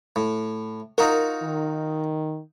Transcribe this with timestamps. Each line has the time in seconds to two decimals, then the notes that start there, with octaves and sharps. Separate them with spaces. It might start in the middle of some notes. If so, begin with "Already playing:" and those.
0.16 A2
0.98 D#4 F4 F#4 A#4
1.43 D#3